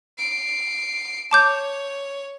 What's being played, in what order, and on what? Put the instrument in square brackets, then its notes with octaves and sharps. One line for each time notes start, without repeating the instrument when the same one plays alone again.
[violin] C7 D7
[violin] C#5 [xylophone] A5 D6 G6